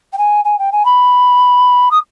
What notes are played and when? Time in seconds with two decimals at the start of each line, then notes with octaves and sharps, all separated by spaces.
0.12 G5
0.18 G#5
0.44 G#5
0.58 G5
0.72 G#5
0.85 B5
1.91 D#6